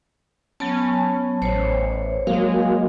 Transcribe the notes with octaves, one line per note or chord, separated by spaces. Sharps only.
F#3 B3 C#4 A5
A1 C5 C#5
F#3 G#3 A#3 F5